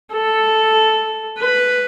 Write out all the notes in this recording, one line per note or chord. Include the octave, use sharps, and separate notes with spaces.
A4
B4